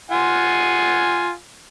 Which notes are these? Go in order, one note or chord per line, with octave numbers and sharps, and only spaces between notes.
F4 F#5 G#5